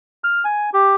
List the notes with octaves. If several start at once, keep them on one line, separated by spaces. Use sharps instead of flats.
F6
G#5
G4